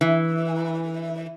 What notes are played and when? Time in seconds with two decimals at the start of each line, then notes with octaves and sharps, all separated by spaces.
0.01 E3